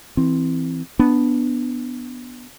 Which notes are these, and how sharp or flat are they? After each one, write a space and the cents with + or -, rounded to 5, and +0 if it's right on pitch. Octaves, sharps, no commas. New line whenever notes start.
E3 +0 C4 +0
B3 +0 D4 +0